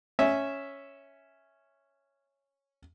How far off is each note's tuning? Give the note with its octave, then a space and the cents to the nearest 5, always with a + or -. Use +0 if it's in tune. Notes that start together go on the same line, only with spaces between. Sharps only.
C#4 +0 E5 -5